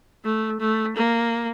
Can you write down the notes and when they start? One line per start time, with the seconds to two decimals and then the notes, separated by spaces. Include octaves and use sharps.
0.24 A3
0.60 A3
0.96 A#3